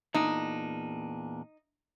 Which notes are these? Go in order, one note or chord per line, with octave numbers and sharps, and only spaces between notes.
E2 A#2 D4 D#4